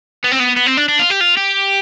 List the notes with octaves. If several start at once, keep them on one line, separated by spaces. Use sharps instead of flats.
B3
C4
B3
B3
C4
D4
D4
F4
G4
F4
G4